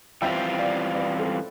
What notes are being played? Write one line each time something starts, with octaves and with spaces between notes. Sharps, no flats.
E3 G3 C4 F4 E5 G5
D5 F5
B4 D5
A4 C5